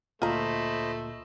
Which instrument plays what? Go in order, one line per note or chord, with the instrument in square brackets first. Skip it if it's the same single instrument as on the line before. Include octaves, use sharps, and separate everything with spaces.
[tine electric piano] D2 A#2 [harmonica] A3 [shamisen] F4 A#5 [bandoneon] C5 D#5 B5